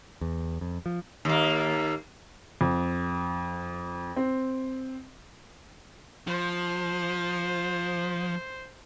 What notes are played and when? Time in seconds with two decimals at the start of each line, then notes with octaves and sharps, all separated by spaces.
0.21 E2
0.61 F2
0.86 F3
1.25 D#2 A#3
2.61 F2
4.16 C4
6.27 F3 C5